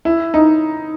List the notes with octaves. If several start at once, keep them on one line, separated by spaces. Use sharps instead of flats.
E4
D#4